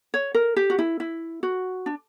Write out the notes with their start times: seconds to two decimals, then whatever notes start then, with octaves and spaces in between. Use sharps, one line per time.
0.14 C#5
0.34 A#4
0.56 G4
0.70 F#4
0.79 E4
1.00 E4
1.43 F#4
1.86 D4